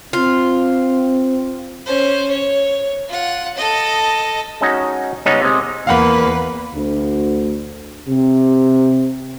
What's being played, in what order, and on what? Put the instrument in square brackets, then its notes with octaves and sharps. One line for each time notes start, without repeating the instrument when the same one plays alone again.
[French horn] C4 [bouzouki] F4
[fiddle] C#4 C5
C#5
F4 F#5
A4 D#5
[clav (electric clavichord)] G#3 C#4 D#4 F#4
C#3 G3 G#3 B3 C#4 D#4
C3 G#3
[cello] E2 B4 [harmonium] A#3 [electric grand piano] F5 F#5 B5
[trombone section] D2
C3